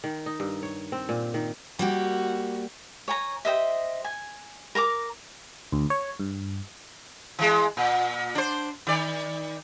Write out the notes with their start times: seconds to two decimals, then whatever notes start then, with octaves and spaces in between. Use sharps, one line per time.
0.04 D#3
0.26 D#4
0.40 G2
0.63 C#5
0.92 C4
1.09 A#2
1.34 D#3
1.79 G3 A#3 F#4 G4
3.08 C#5 G#5 A#5
3.45 G4 C5 D#5 E5
4.04 G#5
4.75 A#4 A#5 C6 D6
5.72 D2
5.90 C#5
6.20 G2
7.39 E3 G#3
7.77 A#2
8.35 D4 C5
8.87 D#3 D5